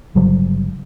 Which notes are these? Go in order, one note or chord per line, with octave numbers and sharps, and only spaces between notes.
G1 C#3 F#3 G3